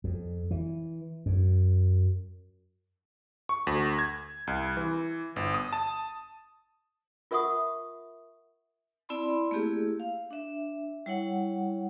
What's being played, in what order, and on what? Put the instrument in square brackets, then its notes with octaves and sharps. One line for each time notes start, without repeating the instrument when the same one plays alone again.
[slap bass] F2
E3
F#2
[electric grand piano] C#6
D2
G#6
C2
E3
G1
D#6
A5
[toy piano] F4 A#4 E5 F#5 C#6 D#6
[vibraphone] C4 E4 D5 A5 B5 C6
A3 A#3 E4 G4 G#4
F5
D4 E5
G3 E4 C#5 F#5